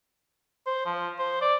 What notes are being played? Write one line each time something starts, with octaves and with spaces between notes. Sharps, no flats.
C5
F3
C5
D5